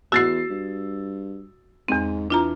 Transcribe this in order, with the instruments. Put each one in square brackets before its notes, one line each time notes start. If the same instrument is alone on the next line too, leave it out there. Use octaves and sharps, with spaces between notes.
[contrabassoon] E2 [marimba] F#4 [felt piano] E6 A6 C7
[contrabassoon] G2
[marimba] E2 C4 [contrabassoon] G#2
[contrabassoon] E3 [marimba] D4 F4 A#5